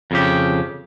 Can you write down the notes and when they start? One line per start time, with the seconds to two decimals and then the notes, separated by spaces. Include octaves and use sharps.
0.11 F2 C#3 G4